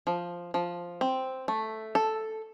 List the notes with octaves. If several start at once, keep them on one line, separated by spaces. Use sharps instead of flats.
F3
F3
C4
A3
A4